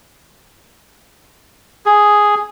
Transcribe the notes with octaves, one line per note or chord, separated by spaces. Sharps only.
G#4